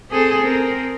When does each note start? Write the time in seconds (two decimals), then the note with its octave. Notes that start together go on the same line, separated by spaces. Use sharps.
0.10 C4 G#4 A4
0.42 C4 A#4